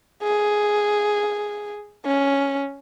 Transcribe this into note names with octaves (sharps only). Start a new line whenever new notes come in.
G#4
C#4